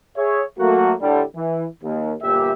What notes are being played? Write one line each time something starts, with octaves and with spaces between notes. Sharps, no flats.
G#4 C#5 E5
F#3 A3 A#3 F#4
A2 D3 G3
E3
D#2
G1 A#2 G4 E5